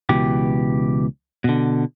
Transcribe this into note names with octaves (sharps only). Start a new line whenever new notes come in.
C#2 B2 E3 G4
B2 D3